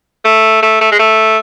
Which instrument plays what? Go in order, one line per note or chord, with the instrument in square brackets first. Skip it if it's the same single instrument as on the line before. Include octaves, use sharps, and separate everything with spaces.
[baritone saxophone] A3
A3
A3
G#3
A3